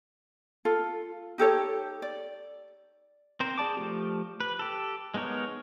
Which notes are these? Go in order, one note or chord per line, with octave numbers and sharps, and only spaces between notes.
F4 A4
D#4 G4 A4 C#5
D5
C4 A#4 C5
G#4 D5 A5 D6
F3 A3 G4
B4
G4 A4
G#3 B3 D#4 A#4 C#5